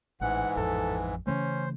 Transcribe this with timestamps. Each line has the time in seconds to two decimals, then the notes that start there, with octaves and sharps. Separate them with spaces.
0.21 A1 G#2 E3 F#5
0.57 A1 F2 A4
1.27 C#3 E3 A3 C#4 C5